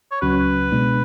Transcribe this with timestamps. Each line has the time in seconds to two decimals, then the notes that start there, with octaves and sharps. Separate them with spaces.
0.12 C#5
0.22 C#2 C#3 F#3 C#4 F#4 B4
0.72 B2 G#3 B3 D4